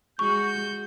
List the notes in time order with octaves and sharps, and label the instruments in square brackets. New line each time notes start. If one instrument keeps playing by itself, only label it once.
[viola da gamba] G#3 F#4 [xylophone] C#6 [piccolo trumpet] G6